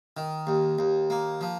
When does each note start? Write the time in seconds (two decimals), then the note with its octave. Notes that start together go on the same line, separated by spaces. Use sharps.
0.17 D#3
0.47 D#2
0.79 D#2
1.10 A#3
1.41 F3